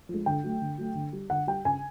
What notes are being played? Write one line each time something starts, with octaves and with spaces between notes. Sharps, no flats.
F3
G#3
D3 G5
F#3 A3
D3
F#3 A3
D3
G3
D3 F#5
G3 G5
C#3 G#5